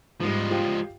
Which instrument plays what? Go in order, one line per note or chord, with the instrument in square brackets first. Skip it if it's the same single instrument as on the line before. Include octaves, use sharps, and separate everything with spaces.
[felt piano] G#2 G3 [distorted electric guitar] F3 G#3
[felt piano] F4 G4 G5